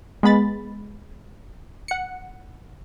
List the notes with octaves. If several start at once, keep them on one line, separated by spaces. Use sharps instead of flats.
G#3 B3 B5 A6
F#5 C#7